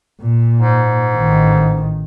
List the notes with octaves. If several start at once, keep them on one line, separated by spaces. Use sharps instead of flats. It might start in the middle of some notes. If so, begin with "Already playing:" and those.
A#2
G#2
A1 D#3